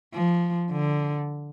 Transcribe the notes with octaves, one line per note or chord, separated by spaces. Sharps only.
F3
D3